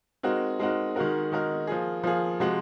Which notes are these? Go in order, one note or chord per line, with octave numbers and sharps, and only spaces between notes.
G#3 C4 D#4 F#4 A#4
G#3 C4 D#4 F#4 A#4
D#3 G#3 D#4 F#4 A#4
D#3 G#3 D#4 F#4 A#4
F3 A#3 F4 G#4
F3 A#3 F4 G#4
C3 F3 G#3 C4 F#4